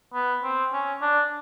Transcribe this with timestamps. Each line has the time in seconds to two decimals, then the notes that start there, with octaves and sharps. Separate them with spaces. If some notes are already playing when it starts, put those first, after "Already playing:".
0.14 B3
0.43 C4
0.73 C#4
1.02 D4